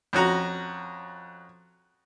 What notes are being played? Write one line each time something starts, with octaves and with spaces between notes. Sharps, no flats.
F2 C#4 F#4 A#5